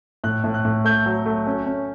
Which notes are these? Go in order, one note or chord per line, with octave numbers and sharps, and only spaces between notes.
A2 F#6
A2
F#6
A2
A3 G6
F#3
A3
C#4
C#4